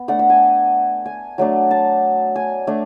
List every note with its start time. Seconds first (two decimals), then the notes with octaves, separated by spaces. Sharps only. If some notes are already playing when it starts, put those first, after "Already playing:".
Already playing: B3
0.08 A3 D4 F#5
0.19 E5
0.30 G#5
1.06 G#5
1.38 F#3 A3 D4
1.71 A5
2.36 G#5
2.67 A3 D4